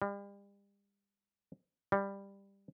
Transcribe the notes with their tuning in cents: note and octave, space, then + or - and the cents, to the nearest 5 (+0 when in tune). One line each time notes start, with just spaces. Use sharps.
G3 +40
G3 +15